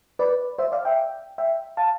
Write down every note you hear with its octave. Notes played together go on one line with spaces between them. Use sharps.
B4 D5
C5 E5
D5 F5
E5 G5
E5 G5
F5 A5